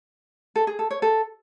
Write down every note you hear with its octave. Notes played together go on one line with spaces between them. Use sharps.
A4
G#4
A4
C#5
A4